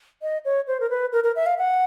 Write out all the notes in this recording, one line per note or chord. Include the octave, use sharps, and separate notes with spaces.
D#5
C#5
C5
A#4
B4
A#4
A#4
E5
F5
F#5